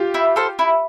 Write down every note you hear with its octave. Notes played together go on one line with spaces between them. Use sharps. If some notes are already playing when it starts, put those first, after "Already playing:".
Already playing: F4 G4
E4
A4 C5 F5
E4